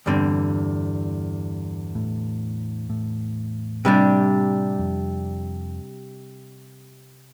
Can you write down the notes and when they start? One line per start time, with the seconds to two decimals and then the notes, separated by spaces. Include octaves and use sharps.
0.06 E2 G2 D3 G3 C4
1.95 A2
2.90 A2
3.85 C3 G3 D4
4.79 F2